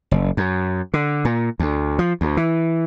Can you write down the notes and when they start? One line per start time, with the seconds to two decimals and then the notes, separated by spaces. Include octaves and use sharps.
0.11 F#1
0.37 F#2
0.94 D3
1.25 A#2
1.60 D2
1.99 F3
2.21 D2
2.37 E3